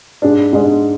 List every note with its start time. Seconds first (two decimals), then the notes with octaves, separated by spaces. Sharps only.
0.22 G#2 G#3 D4
0.53 G#2 G#3 D4